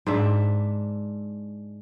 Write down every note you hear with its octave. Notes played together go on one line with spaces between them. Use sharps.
G#2 D4 E5